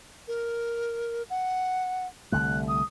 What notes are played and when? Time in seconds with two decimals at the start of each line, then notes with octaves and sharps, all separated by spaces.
0.28 A#4
1.30 F#5
2.32 C2 D3 A3 F#6
2.68 D#6